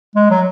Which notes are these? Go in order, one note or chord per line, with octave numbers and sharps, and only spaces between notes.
G#3
F#3